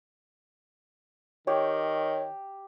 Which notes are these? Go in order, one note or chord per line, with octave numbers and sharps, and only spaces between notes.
D#3 G4 C#5